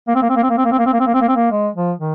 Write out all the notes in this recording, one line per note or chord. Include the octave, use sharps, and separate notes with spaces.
A#3
C4
A#3
C4
A#3
C4
A#3
C4
A#3
C4
A#3
C4
A#3
C4
A#3
C4
A#3
C4
A#3
G#3
F3
D#3